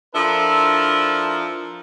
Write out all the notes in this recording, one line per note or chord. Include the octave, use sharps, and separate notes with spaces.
F3 D4 E4 A4 A#4